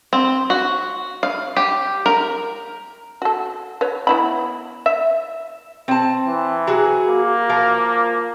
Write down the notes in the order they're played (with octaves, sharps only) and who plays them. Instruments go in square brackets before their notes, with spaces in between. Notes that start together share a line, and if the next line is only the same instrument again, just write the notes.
[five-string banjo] C4
F#4
F5
G4
A#4
[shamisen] F#4 A4
B4 C#5
B3 E4 B5
E5
[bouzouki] C4 A5
[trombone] E3
[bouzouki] F#3 F#4 G#4
[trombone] A#3
[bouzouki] F3 A#4 F5